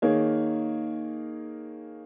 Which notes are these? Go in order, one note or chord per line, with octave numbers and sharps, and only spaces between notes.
D#3 A#3 G#4 C#5